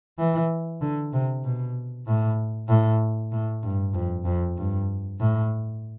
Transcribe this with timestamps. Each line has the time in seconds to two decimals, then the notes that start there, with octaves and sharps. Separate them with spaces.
0.19 E3
0.81 D3
1.13 C3
1.44 B2
2.07 A2
2.69 A2
3.32 A2
3.63 G2
3.94 F2
4.25 F2
4.57 G2
5.20 A2